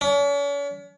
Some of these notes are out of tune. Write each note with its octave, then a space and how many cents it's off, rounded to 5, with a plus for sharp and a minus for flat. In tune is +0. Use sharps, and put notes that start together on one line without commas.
C#4 +45